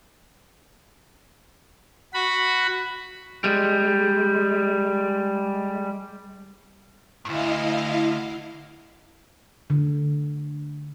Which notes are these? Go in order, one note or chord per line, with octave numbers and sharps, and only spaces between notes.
F#4 B5
G3 G#3
D2 G2 E4 D#5 F5
D3